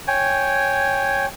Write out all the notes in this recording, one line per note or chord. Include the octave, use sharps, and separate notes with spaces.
C#5 G5 G#5